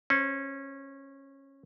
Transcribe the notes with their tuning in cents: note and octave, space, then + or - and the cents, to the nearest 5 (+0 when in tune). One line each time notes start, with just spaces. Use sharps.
C#4 -20 C5 +0